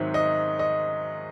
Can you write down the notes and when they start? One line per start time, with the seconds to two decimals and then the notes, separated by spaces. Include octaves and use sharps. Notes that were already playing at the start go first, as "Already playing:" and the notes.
Already playing: G#2 D#3 F#3 C4 E5
0.14 D#5
0.59 D#5